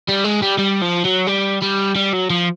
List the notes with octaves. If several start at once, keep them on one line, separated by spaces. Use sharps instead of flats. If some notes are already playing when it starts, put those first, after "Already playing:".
G3
G#3
G3
G3
F3
F#3
G3
G3
G3
F#3
F3